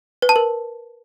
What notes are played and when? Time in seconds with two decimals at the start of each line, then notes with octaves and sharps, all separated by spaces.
0.22 B4
0.29 A5
0.36 A#4